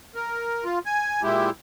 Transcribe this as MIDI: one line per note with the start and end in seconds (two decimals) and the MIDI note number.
0.15 0.64 70
0.64 0.79 65
0.86 1.22 80
1.23 1.50 46
1.23 1.50 56
1.23 1.50 64
1.23 1.50 67